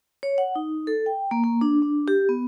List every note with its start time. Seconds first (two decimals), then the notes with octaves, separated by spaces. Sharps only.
0.23 C#5
0.38 F#5
0.56 D#4
0.87 A4
1.06 G5
1.31 A#3
1.44 A#3
1.61 D4
1.82 D4
2.08 G4
2.29 B3